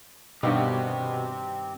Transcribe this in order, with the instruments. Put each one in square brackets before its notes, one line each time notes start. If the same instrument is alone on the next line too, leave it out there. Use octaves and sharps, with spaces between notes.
[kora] G2 D#3 [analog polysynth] B2 [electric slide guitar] C4 G4